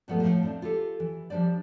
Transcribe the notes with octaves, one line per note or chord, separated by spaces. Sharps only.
G2 A#2 F3 G#3 A3 B3
A2 F3
C4 D4 F4
F4 G4 A4
E3
F3 G3 D4 C5 D5